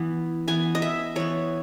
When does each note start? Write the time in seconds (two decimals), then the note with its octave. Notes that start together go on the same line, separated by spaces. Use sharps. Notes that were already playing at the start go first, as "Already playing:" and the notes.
Already playing: E3 B3
0.48 E3 B3 G#5
0.75 D#5
0.82 E5
1.16 E3 B3 C#5